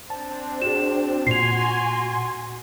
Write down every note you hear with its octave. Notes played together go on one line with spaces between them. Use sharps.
C4 D4 A5
F#4 G#4 E7
A#2 F#4 G#5 C6 C7 F7